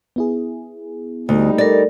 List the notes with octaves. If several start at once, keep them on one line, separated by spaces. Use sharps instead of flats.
B3 E4 G#4
D2 G3 D#4
A4 A#4 D5